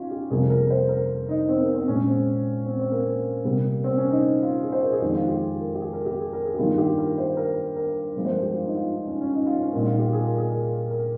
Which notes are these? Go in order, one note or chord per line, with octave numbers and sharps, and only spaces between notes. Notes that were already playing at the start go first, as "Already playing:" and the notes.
Already playing: C#4 D#4 F4
G4
F2 C3 G3 A#3 G#4
A#4
C5
A#4
D#4
C4
A#3
C4
A#2 G#3 C#4
C4
C4
C4
A#3
C3 G3 A#3
C4
C#4
D#4
F4
G#4
C5
A#4
G#4
F2 D#3 G#3 G4
F4
G4
G#4
A#4
G4
G#4
A#4
G4
G#4
A#4
G#4
G4
G2 D#3 G3 A#3 F4
G4
A#4
C5
A#4
A#4
G2 F3 G#3
C5
A#4
G4
F4
D#4
F4
D#4
C#4
C#4
D#4
F4
C#4
A#2 G3 A#3 D#4
F4
G4
G#4
A#4
G#4
A#4
A#4